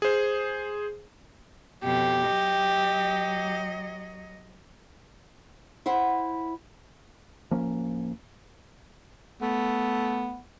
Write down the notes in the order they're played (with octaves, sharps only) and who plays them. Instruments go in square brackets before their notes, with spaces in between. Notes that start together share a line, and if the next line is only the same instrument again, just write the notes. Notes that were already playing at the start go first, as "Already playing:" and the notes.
[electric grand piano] G#4 C5
[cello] F2 B2 [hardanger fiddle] G4
[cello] F#3 D#5
[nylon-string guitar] E4 C5 F#5
[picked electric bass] D1 F3 A#3 C#4
[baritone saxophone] A3 [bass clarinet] B3